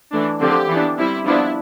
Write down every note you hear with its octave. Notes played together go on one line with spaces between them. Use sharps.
E3 A3 D4
D3 F3 C4 G4
E3 B3 D4
G3 C4 E4
F3 B3 D4 E4